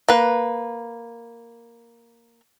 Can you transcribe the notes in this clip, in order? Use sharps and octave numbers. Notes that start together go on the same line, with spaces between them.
A#3 B4